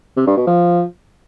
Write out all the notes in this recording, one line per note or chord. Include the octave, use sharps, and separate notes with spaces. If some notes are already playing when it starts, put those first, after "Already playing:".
C3
G2
B2
F3